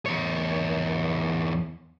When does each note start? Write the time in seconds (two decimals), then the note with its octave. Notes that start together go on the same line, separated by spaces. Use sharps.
0.06 E2 C#5